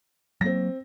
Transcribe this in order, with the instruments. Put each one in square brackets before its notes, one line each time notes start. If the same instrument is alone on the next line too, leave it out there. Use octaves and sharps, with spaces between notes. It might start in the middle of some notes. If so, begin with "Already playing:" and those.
[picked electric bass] F#3 A#3 [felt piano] C4 A#6